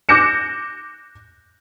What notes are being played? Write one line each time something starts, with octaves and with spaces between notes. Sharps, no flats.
D6 F#6 G6 A#6 C#7 E7